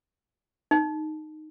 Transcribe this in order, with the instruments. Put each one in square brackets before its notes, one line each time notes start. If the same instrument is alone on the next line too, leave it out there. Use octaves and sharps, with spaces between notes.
[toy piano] D#4